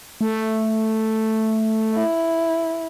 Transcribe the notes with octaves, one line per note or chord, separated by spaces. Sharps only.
A3
E4